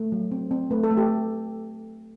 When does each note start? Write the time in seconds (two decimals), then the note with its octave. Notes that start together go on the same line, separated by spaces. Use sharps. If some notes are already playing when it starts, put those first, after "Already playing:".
Already playing: A3
0.12 F#3
0.31 C4
0.51 C4
0.71 A3 B4
0.83 A4
0.91 A3
0.97 G4